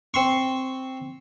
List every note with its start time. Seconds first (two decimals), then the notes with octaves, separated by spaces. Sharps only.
0.14 C4 C6 C#6